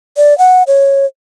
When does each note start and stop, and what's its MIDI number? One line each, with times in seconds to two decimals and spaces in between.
0.17 0.37 74
0.38 0.63 78
0.67 1.05 73